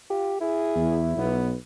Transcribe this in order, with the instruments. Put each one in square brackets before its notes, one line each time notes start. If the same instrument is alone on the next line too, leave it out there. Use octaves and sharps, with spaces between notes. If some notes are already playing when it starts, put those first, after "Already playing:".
[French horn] F4 [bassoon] G4
[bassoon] E4 [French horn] G#4
[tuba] E2
[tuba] B1 [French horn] B3